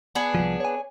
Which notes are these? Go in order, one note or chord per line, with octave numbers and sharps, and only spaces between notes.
B3 D4 G#4
C2 G#2 F3
C#5 G#5